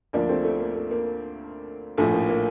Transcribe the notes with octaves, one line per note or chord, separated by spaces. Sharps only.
D2 D3 F3 A#3 D4
A3 C4
A3
A#3
A3
A#3
A#1 A2 F3 A3
A#3
A#3